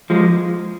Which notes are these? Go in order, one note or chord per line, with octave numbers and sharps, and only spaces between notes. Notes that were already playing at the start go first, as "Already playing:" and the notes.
F3 G#3